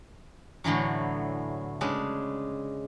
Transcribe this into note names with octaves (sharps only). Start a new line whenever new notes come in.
A2 D3 E3 F#3
C#3 G#3 D4 B4